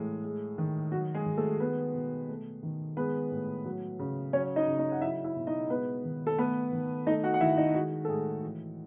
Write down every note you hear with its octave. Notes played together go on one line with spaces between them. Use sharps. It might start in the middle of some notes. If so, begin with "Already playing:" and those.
Already playing: A2 E3 G#3
G#3
D#3
F#3 F#4
G#3 G#4
D#3
A3 A4
G#3 B3 B4
B2
A3
D#3
G#3 B3 B4
A2
F#3
C#3
F#3 C#4 C#5
D#4 D#5
C#3
D#4 D#5
F#5
F#3 E4 E5
E4 E5
B2
D#4 D#5
G#3 B3 B4
D#3
A4
A3 B3 B4
D#3
A3 D#4 D#5
F#4 F#5
F#5
D#3 E4 E5
D#4 D#5
G#3 F#4
A4
A2 G#3 G#4
E3